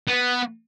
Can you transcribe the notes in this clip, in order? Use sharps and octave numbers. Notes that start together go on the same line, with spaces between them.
B3